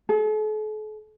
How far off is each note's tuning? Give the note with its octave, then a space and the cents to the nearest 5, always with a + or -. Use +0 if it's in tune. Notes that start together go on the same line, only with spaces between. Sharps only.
A4 -45